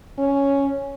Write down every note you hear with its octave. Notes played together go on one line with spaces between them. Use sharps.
C#4